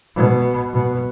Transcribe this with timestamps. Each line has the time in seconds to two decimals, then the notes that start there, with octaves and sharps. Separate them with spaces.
0.15 B2
0.74 B2